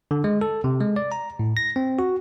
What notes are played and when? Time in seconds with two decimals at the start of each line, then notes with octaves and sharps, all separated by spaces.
0.11 D3
0.24 G#3
0.41 A4
0.64 C3
0.81 G#3
0.96 D5
1.12 A#5
1.39 A2
1.57 A#6
1.76 C4
1.99 F#4